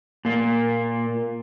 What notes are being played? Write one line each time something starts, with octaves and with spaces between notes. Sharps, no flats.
A#2 A#3